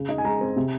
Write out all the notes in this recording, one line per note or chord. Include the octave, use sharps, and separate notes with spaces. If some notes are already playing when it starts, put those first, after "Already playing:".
Already playing: C#3
D#4
G#5
G#3 A#5
C4
C3